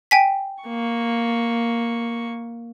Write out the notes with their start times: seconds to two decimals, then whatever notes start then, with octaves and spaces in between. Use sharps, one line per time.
0.11 G5 G#5 B6
0.64 A#3 C#6